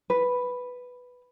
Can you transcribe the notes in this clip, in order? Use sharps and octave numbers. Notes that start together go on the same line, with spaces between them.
B4